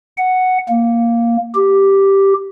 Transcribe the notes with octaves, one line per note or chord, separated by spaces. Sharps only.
F#5
A#3
G4